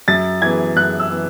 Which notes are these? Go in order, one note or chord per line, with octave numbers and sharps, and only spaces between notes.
F#2 A6
E3 B3 G#6
F#2 F#6
E6
E3 B3